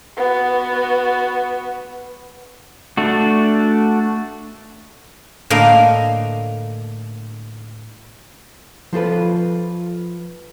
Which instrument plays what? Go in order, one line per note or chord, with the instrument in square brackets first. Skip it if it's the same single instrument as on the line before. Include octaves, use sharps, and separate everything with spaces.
[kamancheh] B3 F#4
[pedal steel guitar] A3 D4 F#4
[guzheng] A2 D3 A#3 D4 D#5 F5
[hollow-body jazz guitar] F3 F4 A4 B4